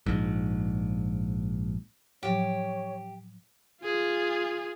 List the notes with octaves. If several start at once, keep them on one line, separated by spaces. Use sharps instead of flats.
A#1 G#2
A2 F3 F#3 G4 C#5
F4 G#4